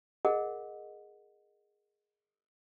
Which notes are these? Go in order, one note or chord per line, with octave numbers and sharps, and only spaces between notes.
G#4 A#4 D#5 F#5